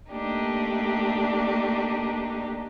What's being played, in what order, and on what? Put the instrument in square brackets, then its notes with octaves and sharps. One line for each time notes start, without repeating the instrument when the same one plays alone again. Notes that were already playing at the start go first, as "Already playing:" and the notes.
[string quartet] A3 A#3 D4 D#4 G4